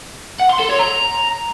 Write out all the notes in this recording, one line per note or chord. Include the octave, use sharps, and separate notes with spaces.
F#5
C6
A4
C#5
A#5